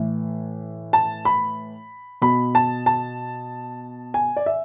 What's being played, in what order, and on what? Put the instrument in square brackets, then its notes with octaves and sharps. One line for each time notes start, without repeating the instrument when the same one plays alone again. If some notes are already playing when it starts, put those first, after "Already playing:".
Already playing: [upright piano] A2 E3
A5
B5
B2 B5
A5
A5
G#5
D5
E5